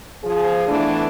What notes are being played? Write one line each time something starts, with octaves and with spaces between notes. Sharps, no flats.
F3 G#4
E3 A3 B3 D4